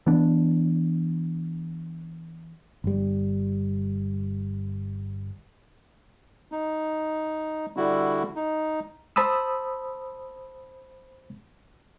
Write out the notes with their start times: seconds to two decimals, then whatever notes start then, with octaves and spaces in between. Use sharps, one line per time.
0.06 E3 B3 D4
2.84 G1 G3
6.52 D#4
7.77 D3 G3 E4 F#4
8.35 D#4
9.16 C5 A5 B5 D#6 E6